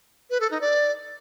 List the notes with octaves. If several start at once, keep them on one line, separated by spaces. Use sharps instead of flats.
B4
A4
D#4
D5